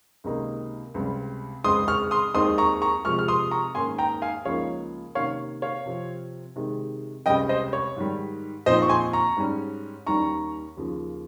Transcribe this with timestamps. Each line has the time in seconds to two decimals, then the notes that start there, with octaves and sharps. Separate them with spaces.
0.24 C#2 C3 D#3 A#3 D#4
0.94 C#2 C3 G3
1.64 C#2 C#3 G#3 C4 C6 D#6
1.88 C#6 F6
2.11 C6 D#6
2.35 D#2 D#3 G#3 C4 D#4 C6 D#6
2.58 A#5 C#6
2.82 A#5 C#6
3.05 C3 F3 G#3 C#6 F6
3.19 F6
3.28 C6 D#6
3.51 A#5 C#6
3.75 G#2 D#3 A#3 C#4 G#5 C6
3.98 G5 A#5
4.22 F5 G#5
4.45 C#2 C#3 F3 A#3 D#4 C#5 F5
5.15 C3 D#3 A#3 C#4 C#5 F5
5.62 C#5 F5
5.86 C3 F3 C4
6.56 C3 D#3 G#3
7.26 C#2 C3 G3 C#4 D#5 G5
7.49 C5 D#5
7.73 C#5
7.96 G#2 D#3 G3
8.66 A#2 F3 C4 D#4 C5 D#5
8.82 C#6
8.89 G#5 C6
9.13 A#5 C#6
9.37 G#2 G3 C#4
10.07 D#2 D#3 G3 C#4 A#5 C#6
10.77 D#2 C#3 F3